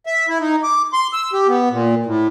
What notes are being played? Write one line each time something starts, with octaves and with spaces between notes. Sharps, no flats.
E5
E4
D#4
D6
C6
E6
G4
B3
A#2
A2